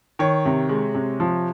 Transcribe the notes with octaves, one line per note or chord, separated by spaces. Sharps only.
D#3 C#5
C3
G#3
C3
F3